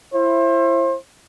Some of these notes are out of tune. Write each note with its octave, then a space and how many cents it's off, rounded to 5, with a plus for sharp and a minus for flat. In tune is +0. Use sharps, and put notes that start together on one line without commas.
E4 +30 C5 +35